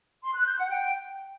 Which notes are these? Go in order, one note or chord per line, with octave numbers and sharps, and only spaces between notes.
C6
F#6
G6
F#5
G5